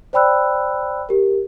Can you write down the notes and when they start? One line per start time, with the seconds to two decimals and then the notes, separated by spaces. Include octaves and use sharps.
0.13 C5 D5 G5 B5 E6 F#6
1.09 G4 A#4